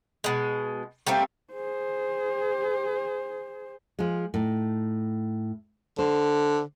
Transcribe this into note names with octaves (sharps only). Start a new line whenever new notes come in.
B2 G#3
G3 A3 A#3 C4
G#4 C5
F3 G#3
A2 D#4
D3 C5